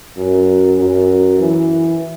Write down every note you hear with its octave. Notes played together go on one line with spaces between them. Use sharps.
F#2
F#2
E3